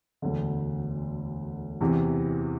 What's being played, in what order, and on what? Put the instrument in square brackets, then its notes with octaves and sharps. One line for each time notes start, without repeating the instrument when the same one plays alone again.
[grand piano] E1 D2 D3
E2 C3 E3